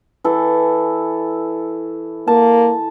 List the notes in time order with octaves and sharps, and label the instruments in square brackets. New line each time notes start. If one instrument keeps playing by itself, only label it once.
[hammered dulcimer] E3 A4
[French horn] A#3 [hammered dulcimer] A5